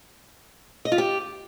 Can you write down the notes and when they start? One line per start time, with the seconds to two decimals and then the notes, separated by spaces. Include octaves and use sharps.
0.85 D#5
0.92 F4
0.98 G4